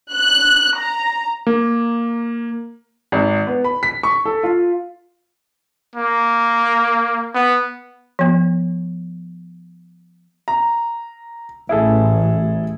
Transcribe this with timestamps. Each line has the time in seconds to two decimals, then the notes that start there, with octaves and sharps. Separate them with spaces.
0.13 F#6
0.77 A#5
1.47 A#3
3.12 G#1
3.47 B3
3.64 B5
3.83 B6
4.03 C#6
4.25 A4
4.43 F4
5.96 A#3
7.35 B3
8.19 F3 B3
10.48 A#5
11.69 A1 E4 G#4 A4